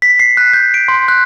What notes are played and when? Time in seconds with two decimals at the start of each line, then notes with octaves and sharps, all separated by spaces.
0.02 B6
0.20 C7
0.37 F#6
0.53 G6
0.74 D7
0.88 C6
1.08 F#6